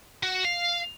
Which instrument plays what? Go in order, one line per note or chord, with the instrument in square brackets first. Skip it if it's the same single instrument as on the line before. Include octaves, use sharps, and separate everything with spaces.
[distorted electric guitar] F#4
F5